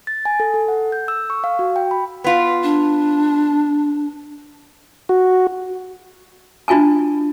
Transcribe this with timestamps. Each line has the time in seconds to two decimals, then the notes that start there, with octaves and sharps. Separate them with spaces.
0.07 A6
0.25 G#5
0.40 A4
0.54 A4
0.68 F#5
0.92 G6
1.08 E6
1.30 C#6
1.44 F5
1.59 F#4
1.76 G5
1.91 B5
2.24 B3 F4
2.63 D4
5.09 F#4
6.68 D4 E4 F4 G#5 A5